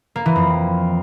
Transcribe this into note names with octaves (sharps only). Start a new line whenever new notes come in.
A#3
E3
F2